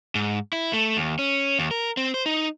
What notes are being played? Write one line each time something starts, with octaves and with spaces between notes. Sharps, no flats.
G#2
E4
A3
D#2
C#4
D#2
A#4
C4
C5
D#4